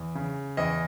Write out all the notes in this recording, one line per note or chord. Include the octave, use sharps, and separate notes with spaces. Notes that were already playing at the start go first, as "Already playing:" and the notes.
Already playing: E2
C#3
E2 D#5